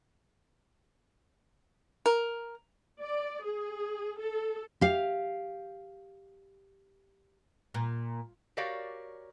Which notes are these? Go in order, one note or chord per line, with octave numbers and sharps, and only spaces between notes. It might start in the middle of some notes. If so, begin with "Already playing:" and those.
A#4
D5
G#4
A4
G4 F5
A#2
F#4 G4 A#4 C#5 D5 F5